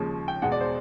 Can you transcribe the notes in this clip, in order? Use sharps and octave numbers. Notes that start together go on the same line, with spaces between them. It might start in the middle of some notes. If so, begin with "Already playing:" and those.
Already playing: D#2 C#3 F3 G#3
G5
E2 B2 G#3 F#5
D5
C5